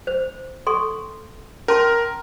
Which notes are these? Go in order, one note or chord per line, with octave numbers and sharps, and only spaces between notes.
C5
A4 C6 C#6
C#4 A#4 A5 C6